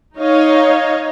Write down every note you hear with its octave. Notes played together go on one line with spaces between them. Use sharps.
D#4 C#5 D#5 F5